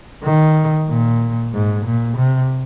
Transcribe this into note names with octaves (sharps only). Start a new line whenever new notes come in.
D#3
A#2
G#2
A#2
C3